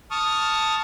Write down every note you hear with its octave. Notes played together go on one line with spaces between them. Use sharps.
A5 C#6 D#6 F6